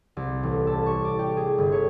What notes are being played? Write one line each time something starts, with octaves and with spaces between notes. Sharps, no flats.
C2
A1
A4
C#6
D5
G4
G#4
G1
C#5